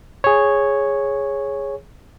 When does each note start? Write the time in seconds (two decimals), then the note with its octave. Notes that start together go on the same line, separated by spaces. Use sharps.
0.24 G#4 C#5